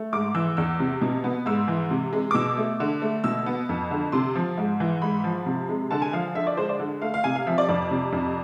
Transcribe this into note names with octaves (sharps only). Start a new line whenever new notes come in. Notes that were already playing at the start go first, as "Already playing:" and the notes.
Already playing: A3
G#2 D6
E3 E6
E2 E6
C3
B2
B3
G#2 E6
E3
C3
G#3
D6
B2 E6
A3
D3
A3
B2 E6
B3
F2
D3
C3 C6
F3
G#2
E3
G#2 B5
F3
C3
G#3
D3 A5
G#5
F3 F5
D3 E5
D5
G#3 C5
D5
D3
A3 F5
F5
C3 G#5
F5
F3 E5
D5
F2 D5
C3
F2